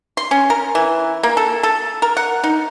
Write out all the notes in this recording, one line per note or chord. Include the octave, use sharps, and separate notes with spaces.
C6
C#4
A#4
E3
A#3
A4
A4
A#4
F#5
D#4